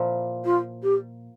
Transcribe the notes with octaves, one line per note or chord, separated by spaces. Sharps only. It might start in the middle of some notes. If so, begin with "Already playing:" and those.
Already playing: A#2 F3 A#3 E4
F4
G4